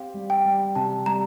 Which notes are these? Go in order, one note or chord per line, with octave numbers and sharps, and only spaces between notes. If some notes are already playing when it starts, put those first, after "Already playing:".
Already playing: C4 G4 F5
G3
G5
G3
C3 A5
G3 A#5